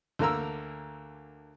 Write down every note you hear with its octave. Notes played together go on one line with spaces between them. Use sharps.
D2 D3 A#3 A#4 A#5 E6